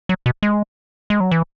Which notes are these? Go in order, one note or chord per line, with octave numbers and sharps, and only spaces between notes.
F#3
B2
G#3
G#3
F#3
E3